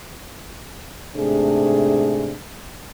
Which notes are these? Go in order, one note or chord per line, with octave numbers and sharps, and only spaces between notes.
G#2 C3 A3 D4 G#4